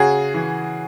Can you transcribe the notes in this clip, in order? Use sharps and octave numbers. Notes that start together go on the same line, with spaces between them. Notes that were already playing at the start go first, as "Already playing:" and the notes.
Already playing: C#3 F#4 G#4
E3